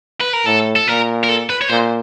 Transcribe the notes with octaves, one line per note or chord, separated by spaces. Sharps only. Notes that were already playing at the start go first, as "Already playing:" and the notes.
B4
A#4
A2 A4
A4
A#2 A#4
A#4
A4
B4
C#5
A#2 C5